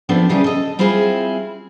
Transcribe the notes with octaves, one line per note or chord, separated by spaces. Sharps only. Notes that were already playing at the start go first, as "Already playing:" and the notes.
F3 B3 C4 D4 A4
C#3 E3 G3 D4 F4 G#4
A4 D#5
G3 C4 E4 F4 G#4